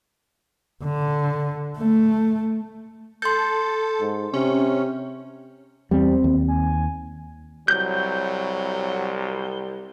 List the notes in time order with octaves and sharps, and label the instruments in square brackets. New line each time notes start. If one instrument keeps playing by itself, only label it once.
[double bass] D3
A3
[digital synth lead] A4 [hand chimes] C6 G6
[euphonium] G#2
[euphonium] C3 [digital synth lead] C#4
[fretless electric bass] E2 G3 [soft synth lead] C4
[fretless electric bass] D#2
[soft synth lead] G#5
[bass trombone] C2 [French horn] F#3 [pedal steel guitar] G6